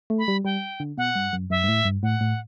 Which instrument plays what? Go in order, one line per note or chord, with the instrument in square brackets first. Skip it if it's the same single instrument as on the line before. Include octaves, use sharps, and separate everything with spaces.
[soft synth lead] A3
[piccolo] B5
[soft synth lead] G3
[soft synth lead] G3 [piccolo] G5
[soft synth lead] D3
[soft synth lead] B2 [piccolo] F#5
[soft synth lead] G2
F#2
[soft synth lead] F#2 [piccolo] E5
[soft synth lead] G2
A2
G2
[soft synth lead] A2 [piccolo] F#5
[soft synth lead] A2